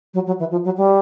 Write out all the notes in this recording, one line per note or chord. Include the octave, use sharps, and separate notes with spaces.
F#3
F#3
E3
F3
F#3
G3